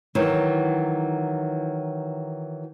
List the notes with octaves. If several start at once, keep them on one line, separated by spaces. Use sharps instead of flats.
D#3 E3 F#3